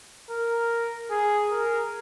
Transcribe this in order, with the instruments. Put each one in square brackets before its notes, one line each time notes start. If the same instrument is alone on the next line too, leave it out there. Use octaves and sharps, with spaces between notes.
[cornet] A#4
G#4
A#4